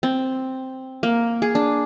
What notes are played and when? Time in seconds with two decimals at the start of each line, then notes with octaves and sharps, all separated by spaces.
0.03 C4
1.03 A#3
1.42 G#4
1.55 D4